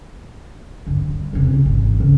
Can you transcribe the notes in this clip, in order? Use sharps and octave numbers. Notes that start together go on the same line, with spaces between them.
G2 D3
G3
E2 C3
C#2
G#1 E3
C#3